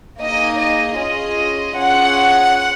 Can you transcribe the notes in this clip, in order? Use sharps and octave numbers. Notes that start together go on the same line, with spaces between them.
A#3 D#4 G#4 D#5
D#5
C#4 F4 G#4 D#5
C#4 F4 G#4 F#5